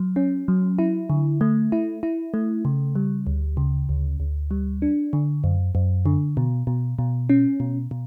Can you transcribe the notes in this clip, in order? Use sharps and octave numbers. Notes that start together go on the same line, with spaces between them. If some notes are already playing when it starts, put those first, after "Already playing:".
Already playing: F#3
C#4
F#3
E4
D3
A3
E4
E4
A3
C#3
G3
D2
C#3
D2
D2
G3
D4
D3
F#2
F#2
D3
B2
B2
B2
C#4
B2
B2